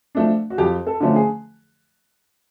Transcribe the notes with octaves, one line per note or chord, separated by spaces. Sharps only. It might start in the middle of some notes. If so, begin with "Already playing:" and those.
F3 A3 D4
F#4
F2 G4
A4
D3 F3 A3 C#4
G#4